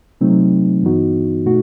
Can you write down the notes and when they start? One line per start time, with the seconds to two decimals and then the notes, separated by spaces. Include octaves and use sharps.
0.21 C3 F#3 A3 C4 D#4
0.83 G2 E3 B3 D#4 F#4
1.45 B2 A3 D#4 F#4